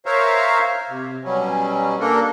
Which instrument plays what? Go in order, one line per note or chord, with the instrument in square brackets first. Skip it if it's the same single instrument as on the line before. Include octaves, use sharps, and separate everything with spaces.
[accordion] A#4 C5 C#5 E5 F5
C3
B2 F#3 G3 C#4
A#3 D4 A4 A#4